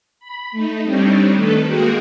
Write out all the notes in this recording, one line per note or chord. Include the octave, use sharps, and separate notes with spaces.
B5
A3 D#4
G3 C4 D4 D#4 C#5
D#3 A3 A4 B4
G#3 A#3 F#4 G#4 A#4 G5